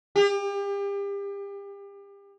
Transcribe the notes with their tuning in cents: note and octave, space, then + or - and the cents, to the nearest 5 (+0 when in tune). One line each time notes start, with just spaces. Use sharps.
G4 +35